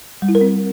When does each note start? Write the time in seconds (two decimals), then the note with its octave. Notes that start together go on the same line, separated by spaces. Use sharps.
0.22 G3
0.29 E4
0.35 A#4
0.41 C4